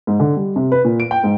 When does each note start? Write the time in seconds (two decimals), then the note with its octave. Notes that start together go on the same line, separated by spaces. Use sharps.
0.07 G#2
0.20 D3
0.37 G3
0.56 C3
0.72 B4
0.84 A#2
1.00 D7
1.11 G5
1.24 G#2